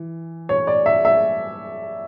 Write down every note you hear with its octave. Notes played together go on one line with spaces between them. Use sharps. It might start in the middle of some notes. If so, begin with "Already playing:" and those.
Already playing: E3
C#5
D5
E5
E5